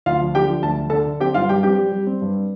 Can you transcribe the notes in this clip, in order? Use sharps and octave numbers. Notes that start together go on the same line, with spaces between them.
D2 F4 F5
F3
D3 G4 G5
F3
D2 A5
D3
D3 A4 A5
D3
C4 G4 G5
G2 F4 F5
G2 G4 G5
C4 G4 G5
G3
G3
C4
G2